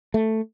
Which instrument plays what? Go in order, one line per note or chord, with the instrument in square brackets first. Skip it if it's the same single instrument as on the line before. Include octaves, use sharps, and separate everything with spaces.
[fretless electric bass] A3